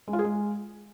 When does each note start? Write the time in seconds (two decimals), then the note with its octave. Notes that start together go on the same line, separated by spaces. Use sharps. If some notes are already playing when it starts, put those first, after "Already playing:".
0.08 G#3
0.13 F4
0.19 G#4
0.24 G#3